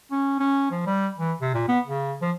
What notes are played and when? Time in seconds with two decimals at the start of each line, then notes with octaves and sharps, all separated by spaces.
0.11 C#4
0.40 C#4
0.71 F3
0.87 G3
1.18 E3
1.41 C3
1.54 A#2
1.68 B3
1.87 C#3
2.22 F3